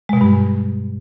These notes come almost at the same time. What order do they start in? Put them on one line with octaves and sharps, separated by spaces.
G#3 B2 G3 G2